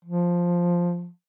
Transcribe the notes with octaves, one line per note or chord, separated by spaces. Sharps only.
F3